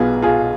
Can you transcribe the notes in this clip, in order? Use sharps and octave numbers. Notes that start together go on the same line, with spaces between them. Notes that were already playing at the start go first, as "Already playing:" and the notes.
Already playing: B1 B2 B3 F4 G#4
F4 G#4